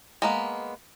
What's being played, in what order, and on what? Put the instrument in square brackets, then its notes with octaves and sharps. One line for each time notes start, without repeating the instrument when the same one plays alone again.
[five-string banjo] G#3 A#3 B3